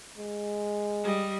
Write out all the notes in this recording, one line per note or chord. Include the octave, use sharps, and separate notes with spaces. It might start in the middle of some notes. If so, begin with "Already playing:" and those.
G#3
G3 D#5